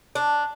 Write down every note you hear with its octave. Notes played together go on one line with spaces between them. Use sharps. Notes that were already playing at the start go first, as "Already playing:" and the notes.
D4